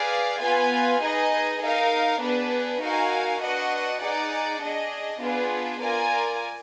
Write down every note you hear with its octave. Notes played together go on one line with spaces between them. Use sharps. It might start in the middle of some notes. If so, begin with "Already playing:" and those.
Already playing: G#4 B4 D5 F5
B3 F4 B4 F5 G#5
D#4 G#4 B4 D#5
D#4 A#4 F5
B3 D4 G#4 B4
D#4 F#4 A#4 F5 G#5
D4 F#4 B4 D#5 F#5
D#4 G#4 D5 F#5
D4 G#4 D#5
B3 D4 F4 G#4 B4
F4 A#4 D5 G#5